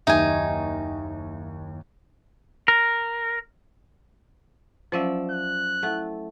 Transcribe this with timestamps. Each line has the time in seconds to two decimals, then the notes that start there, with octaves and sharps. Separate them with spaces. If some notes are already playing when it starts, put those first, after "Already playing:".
0.07 F#1 D#2 D#4 G4 E5 G#5
2.68 A#4
4.92 F3 F#3 C#4 D5 E5
5.31 F#6
5.83 A3 E4 A4 F#5